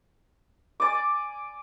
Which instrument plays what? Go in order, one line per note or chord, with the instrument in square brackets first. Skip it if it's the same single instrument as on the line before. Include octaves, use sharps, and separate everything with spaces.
[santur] D5 G#5 D6